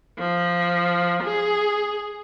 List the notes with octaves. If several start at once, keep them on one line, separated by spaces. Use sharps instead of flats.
F3
G#4